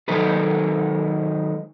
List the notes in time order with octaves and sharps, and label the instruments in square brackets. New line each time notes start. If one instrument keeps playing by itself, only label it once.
[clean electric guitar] D#3 F#3 G#3 D#4 A4 B4